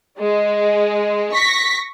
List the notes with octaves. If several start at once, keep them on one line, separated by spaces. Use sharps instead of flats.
G#3
C#6 A#6 B6